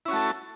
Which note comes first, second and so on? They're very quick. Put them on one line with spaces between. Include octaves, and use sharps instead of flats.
E4 C#4 F#4 A3 A4